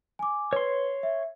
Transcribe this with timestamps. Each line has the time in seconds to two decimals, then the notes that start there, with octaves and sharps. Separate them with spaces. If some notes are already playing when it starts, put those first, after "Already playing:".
0.19 G#5 D6
0.53 B4 C#5 C6
1.03 E5